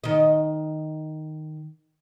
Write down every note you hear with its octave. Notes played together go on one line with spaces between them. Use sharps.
D#3 D#5